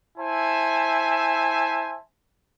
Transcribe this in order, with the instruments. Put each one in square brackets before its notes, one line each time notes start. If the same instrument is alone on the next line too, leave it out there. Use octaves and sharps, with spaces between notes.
[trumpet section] E4 C5 E5 G#5 A5